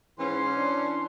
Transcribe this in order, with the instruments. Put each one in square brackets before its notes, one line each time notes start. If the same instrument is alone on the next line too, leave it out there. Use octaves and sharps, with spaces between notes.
[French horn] G#2 [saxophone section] E3 C#4 [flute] C6
[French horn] D4